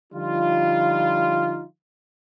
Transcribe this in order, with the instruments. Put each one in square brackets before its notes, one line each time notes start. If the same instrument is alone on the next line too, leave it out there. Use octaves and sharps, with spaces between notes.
[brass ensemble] D3 F3 G3 D#4 F4